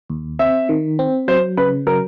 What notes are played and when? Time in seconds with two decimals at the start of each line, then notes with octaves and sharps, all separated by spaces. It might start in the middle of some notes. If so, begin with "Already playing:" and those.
0.10 D#2
0.39 C4 E5
0.69 D#3
0.99 C4
1.28 F#3 C5
1.57 C#3 B4
1.87 F#3 A#4